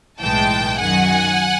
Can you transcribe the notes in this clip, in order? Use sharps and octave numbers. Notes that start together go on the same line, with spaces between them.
B1 A2 E3 G#3 G5 A5
F#2 D#3 F#3 F#5 G#5